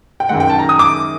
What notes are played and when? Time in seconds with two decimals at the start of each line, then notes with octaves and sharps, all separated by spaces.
0.20 G5
0.29 F#2 D#3 G#3 F#5
0.40 G5
0.50 A5
0.59 A#5
0.69 D#6
0.79 D6